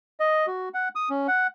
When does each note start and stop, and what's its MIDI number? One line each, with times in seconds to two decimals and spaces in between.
0.20 0.46 75
0.47 0.69 66
0.74 0.89 78
0.95 1.09 87
1.10 1.27 61
1.28 1.47 78